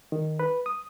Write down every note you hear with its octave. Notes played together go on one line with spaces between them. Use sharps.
D#3
B4
D#6